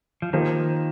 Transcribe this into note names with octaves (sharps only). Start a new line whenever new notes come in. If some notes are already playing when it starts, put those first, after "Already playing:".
F3
D#3 F3 A#3 G4 C5